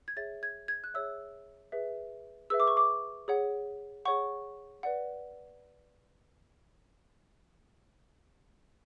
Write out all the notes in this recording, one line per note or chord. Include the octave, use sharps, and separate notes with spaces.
G#6
G#4 C#5 E5 A6
G#6
G#6
F#6
G#4 C#5 E5 E6
G#4 B4 E5
G#4 B4 E5 E6
D6
C#6
D6
G#4 C#5 F#5
G#4 C#5 F#5 C#6
B4 D5 F#5